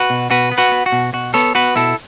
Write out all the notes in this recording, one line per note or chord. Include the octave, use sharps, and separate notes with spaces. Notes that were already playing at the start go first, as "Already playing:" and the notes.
Already playing: F#4 B4
B2
B2 F#4 B4
B3
F#4 B4
B3
F#4
B2
B2 F#4
B3 A4 C#5
B3 F#4 B4
B2 E4 A4